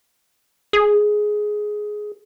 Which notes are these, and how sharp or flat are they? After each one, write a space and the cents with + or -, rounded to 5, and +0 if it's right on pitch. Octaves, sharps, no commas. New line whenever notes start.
G#4 +10